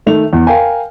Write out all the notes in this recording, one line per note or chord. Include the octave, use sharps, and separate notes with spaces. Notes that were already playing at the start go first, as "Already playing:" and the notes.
D#3 A3 F7
E2
A#4 F5 G5 G#5